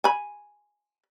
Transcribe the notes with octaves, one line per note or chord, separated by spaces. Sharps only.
G#5 B5